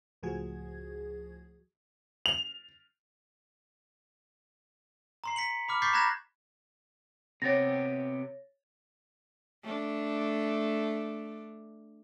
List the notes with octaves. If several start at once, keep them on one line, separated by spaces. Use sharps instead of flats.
C#2 A2 F3 F#4 G#4 G#6
F7
A#5 C6 C7
B6 C#7 F#7
B5 D6 F6
C#6 D6 G6 A6 B6 C7
A#5 B5 F#6 G#6 A#6 E7
C3 B3 G4 C#5 A6 A#6
A3 D4